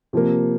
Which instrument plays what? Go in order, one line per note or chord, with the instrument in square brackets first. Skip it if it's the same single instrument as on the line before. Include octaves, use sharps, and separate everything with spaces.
[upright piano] C3 F3 A#3